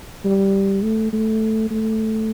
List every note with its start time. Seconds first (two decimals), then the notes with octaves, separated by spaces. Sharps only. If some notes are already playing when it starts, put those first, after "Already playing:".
0.24 G3
0.82 A3
1.13 A3
1.71 A3